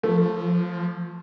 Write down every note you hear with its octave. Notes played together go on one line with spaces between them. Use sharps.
F3 A3